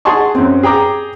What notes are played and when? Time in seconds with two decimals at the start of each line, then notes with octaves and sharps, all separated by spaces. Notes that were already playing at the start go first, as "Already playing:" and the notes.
0.05 G#4 F#5 G#5 A5 C6 C#6
0.35 F#2 C4
0.63 G#4 G5 A#5 D6